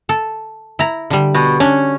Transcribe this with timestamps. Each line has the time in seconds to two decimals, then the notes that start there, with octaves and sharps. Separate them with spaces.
0.09 A4
0.79 E4 A#5
1.10 D3 G3
1.34 B2
1.60 C#4 D4